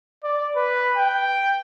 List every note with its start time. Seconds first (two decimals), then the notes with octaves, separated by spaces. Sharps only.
0.24 D5
0.56 B4
0.96 G5